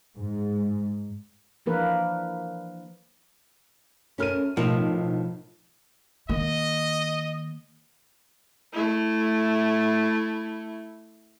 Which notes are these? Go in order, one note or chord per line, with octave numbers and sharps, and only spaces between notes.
G#2
E3 F3 A#3 D4 A#4 B4
F#2 C#4 A4 A#4 F6 D#7
B1 A2 F3 A#4
D#3 A#3 D#5
A3 E4